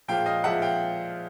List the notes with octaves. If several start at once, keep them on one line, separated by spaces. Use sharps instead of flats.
A#2 F3 G#3 F5 G5
D#5 F5
A#2 F3 G#3 E5 F#5
F5 G5